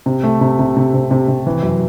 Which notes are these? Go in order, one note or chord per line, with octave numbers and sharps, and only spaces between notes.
C3
A3
C3
C3
C3
C3
C3
C3
E3
F#2